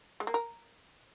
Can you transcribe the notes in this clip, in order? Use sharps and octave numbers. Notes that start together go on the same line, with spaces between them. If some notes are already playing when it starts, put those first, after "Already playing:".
G#3
A#3
A#4